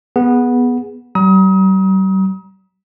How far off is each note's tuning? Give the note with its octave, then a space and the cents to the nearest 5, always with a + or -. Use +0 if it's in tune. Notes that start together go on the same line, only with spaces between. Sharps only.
B3 -10 G#4 +0
G3 -45 A#5 +35 D#6 +35